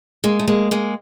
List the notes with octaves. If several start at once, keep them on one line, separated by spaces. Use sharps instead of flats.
G#3 A#3
A3
G#3 A#3
G#3 A#3